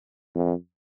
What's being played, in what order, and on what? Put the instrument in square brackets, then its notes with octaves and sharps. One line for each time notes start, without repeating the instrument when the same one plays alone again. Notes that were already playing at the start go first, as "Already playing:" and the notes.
[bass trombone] F2